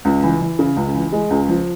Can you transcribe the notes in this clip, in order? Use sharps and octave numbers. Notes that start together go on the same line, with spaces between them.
C#2
E3
E3
C#3
C#2
E3
G#3
C#2
F3